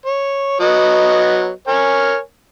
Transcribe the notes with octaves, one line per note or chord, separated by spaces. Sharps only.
C#5
F#3 B3 D#5
A#4 C#5 G#5